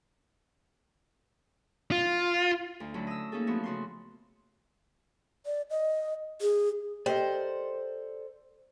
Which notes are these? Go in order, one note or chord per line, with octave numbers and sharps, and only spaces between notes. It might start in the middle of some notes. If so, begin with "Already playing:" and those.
F4
D2
D3 F#3 A3 C#4 E4
D#5 E6
A#3 C#4 D#4 G#4 A4
F3 A3 B3 F#4
C#3 F#4 C6
D5
D#5
G#4
G4 A4 A#4 C5 D5 D#5